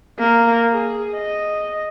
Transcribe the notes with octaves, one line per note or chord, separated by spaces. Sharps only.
A#3
G#4
D#5